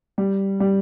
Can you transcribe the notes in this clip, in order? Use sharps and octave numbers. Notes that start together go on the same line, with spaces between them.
G3
G3